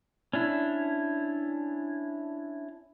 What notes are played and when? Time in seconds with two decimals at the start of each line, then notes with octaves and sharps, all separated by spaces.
0.33 C#4 D4 E4